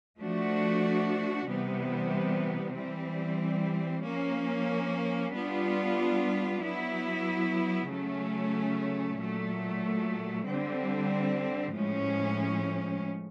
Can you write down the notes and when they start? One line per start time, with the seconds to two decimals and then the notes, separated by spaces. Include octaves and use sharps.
0.20 F3 A3 D4 F#4
1.49 C3 E3 G3 B3
2.76 E3 G3 C4
4.05 F3 A#3 C#4
5.34 G3 B3 D4 F4
6.62 F#3 B3 E4
7.90 C#3 F#3 A3 C#4
9.18 A#2 F#3 A3
10.48 D3 G3 C4
11.76 A2 F3 G#3 C#4